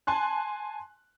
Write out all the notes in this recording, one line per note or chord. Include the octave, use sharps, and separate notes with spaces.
G#5 A5 C6 F#6